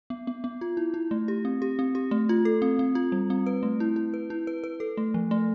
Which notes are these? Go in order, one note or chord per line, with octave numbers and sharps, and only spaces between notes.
B3
B3
B3
F4
E4
E4
A3
G4
C4
G4
C4
G4
A3
F4
A4
C4
C4
F4
G3
C4
B4
A3
E4
E4
B4
E4
B4
B4
A4
A3
F3
A3